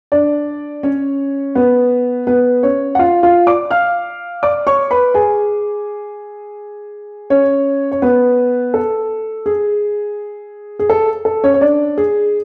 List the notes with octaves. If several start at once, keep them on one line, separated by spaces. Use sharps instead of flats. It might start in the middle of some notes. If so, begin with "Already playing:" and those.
D4 D5
C#4 C#5
B3 B4
B3 B4
C#4 C#5
F#5
F4 F5
F4 F5
D5 D6
F5 F6
D5 D6
C#5 C#6
B4 B5
G#4 G#5
C#4 C#5
C#5
B3 B4
A4
G#4
G#4
A4
A4
C#4 C#5
C#5
D4 D5
G#4